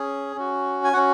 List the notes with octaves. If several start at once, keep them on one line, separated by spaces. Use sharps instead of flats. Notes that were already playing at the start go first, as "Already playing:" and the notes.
Already playing: C#4 G#4
C#4 F#4
G#5
C#4 F#4 F#5